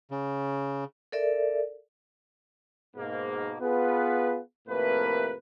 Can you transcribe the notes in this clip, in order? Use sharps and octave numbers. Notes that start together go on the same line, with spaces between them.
C#3
A4 A#4 D5 E5
G#2 B2 A#3
B3 F4 G#4 B4
F2 A2 C3 A#3 A#4 B4